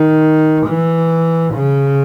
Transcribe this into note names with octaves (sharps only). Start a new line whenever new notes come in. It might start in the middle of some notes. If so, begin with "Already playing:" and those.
Already playing: D#3
E3
C#3